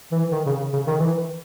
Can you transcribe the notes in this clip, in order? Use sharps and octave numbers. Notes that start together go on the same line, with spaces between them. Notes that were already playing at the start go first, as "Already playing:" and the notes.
E3
D#3
C#3
C#3
D#3
E3